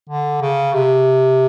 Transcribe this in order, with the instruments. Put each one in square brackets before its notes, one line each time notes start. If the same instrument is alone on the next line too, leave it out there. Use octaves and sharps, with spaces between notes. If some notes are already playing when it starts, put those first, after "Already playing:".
[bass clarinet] D3
C#3
C3